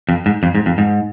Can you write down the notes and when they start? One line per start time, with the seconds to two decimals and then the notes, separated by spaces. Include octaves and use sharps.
0.09 F2
0.26 G#2
0.43 F2
0.55 G#2
0.66 F2
0.78 G#2